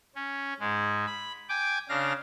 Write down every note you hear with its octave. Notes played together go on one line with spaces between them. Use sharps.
C#4
G#2 G#3
B5
G5 G#5 D6
C#3 D4 F5 A#6